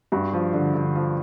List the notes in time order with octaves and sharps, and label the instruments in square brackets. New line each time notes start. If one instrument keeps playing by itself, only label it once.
[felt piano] G2 F#4
F3
D3
D3
F3